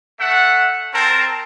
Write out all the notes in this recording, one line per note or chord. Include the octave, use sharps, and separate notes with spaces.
A3 E5 F#5
C4 A#4 A5